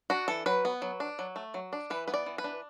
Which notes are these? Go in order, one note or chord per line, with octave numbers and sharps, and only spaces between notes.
D4 F#4
E3 A4
F#3 B4
B3
F#3
D4
F#3
A3
F#3
D4
E3 B4
B3 B4
D5
E3
B4
D4